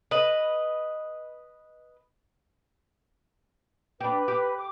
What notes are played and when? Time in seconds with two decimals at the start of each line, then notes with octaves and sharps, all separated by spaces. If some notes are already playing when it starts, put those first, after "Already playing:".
0.11 B4 D#5
4.01 D4 G4 B4
4.28 G4
4.56 D6